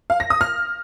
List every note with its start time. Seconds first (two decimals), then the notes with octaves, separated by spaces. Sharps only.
0.10 F5
0.20 A#6
0.30 D#6
0.41 F6